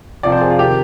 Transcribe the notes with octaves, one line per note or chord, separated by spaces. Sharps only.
F2 C3 F3 D5
C5
G#4
F4
C3 D#3 G4